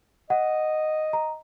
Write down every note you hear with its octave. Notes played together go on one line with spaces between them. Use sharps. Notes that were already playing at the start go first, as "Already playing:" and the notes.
D#5 F#5
A#5